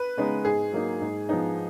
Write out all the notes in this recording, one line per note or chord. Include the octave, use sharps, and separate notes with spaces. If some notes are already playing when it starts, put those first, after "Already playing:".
Already playing: B4
C#3 G#3 B3 D#4
G#2 G#4
F#3 A#3 D#4
G#2
F3 B3 D#4